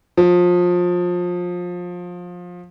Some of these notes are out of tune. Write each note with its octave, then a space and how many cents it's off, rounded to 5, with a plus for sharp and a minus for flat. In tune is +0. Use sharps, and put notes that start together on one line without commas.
F3 +25